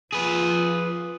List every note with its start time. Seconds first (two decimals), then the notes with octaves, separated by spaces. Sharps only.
0.12 F3 F4 G#4 B4